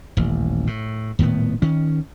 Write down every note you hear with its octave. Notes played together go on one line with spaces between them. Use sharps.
D#1 A1
A2
D#1 A2 D#3 B3
D#3 C#4